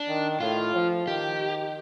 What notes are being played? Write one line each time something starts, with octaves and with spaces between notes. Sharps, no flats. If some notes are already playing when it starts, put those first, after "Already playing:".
Already playing: D4
D#3
A2 F4
F3
D#3 G4